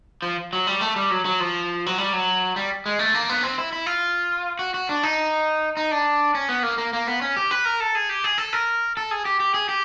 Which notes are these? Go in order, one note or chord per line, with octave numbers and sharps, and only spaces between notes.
F3
F#3
G3
A3
G3
F#3
F#3
F3
F#3
G3
F#3
G3
G#3
A3
A#3
B3
C4
E4
E4
F4
F#4
F#4
D4
D#4
D#4
D4
C#4
B3
A#3
A#3
A#3
B3
C#4
G4
B4
A#4
A4
G#4
G4
G#4
A4
A#4
A4
G#4
G4
G4
G#4
G4